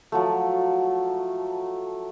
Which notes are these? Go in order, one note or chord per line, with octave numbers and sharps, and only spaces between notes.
F3 F#3 A3